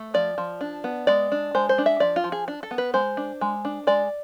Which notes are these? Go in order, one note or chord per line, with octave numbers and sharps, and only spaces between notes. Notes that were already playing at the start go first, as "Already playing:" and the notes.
Already playing: A3
F3 D5
F3
D4
B3
G#3 D5
D4
G#3 C5
C5
D4
E5
F3 D5
F4
F3
G#4
D4
A4
B3
B4
G#3 C5
D4
G#3
D4
G#3 D5